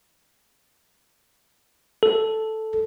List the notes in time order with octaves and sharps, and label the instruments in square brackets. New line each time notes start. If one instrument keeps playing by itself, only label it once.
[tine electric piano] A4